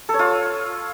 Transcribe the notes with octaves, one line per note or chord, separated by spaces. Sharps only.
A4
C#5
F4